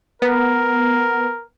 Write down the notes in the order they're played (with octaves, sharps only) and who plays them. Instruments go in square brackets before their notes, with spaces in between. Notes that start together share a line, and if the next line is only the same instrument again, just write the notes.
[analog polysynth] B3 [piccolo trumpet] A#4